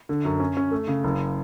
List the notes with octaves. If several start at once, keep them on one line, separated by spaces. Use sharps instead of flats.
D3
F#2
C#4
C#4
A3
C#3
F#1